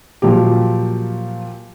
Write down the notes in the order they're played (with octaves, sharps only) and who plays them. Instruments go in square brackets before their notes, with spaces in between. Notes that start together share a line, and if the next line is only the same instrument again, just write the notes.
[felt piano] A#2 F3 F#3 G4